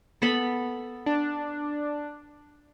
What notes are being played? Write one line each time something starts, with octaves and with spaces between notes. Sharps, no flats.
B3 A4 B5
D4